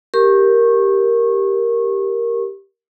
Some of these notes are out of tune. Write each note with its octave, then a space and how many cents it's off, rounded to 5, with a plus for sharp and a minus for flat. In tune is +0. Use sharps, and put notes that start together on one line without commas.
G4 +0 A#4 +0 C#6 -25